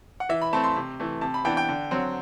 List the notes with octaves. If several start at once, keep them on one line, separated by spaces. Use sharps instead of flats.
F#5
E3 E5
B5
A3 C4 A5
C6
C3
E3 A3
C3 A5
B5
E3 B3 D4 G5
G5
D3
F#3 C4